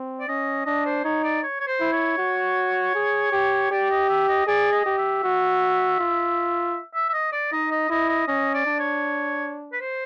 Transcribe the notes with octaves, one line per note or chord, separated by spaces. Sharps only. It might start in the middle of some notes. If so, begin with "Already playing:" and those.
Already playing: C4
D5
C#4 D#5
D4 D#5
C5
D#4 C#5
D5
C#5
C#5
C5
E4
C#5
F#4
G#4
G4
G4 D5
D#5
E5
D#5
G#4 D5
D#5
G4
E5
F#4
F4
E5
E5
D#5
D5
D#4 D#5
D#5
E4 D#5
D#5
C#4 D#5
D5
D4
C#5
B4
C5